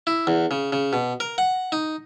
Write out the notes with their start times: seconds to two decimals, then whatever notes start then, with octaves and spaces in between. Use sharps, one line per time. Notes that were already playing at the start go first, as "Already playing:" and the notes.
0.07 E4
0.27 E2
0.51 C#3
0.72 C#3
0.93 B2
1.20 A#4
1.38 F#5
1.72 D#4